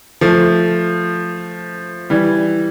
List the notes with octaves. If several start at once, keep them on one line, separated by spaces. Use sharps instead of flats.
F3 A3
E3 G3